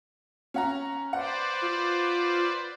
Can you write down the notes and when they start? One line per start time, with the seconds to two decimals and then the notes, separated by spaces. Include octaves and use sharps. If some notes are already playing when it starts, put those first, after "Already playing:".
0.54 C#4 F#5 A#5
1.13 B4 C5 D5 F#5
1.63 F4